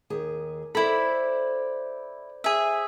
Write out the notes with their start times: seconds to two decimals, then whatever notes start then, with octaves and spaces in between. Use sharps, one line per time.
0.10 D#2 G#4
0.75 E4 A4 C5 D5 B5
2.44 G#4 E5